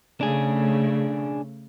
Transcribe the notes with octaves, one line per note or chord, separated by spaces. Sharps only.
C#3 A3 D4 G#4